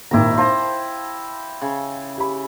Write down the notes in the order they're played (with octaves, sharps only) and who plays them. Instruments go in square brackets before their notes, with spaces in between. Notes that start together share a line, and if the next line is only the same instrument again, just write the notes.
[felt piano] G#1 D#2 A#2 [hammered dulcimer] E4 G4 A#5
[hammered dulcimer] C5 A#5 [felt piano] F5 A5
[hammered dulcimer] C#3
[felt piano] G4 B5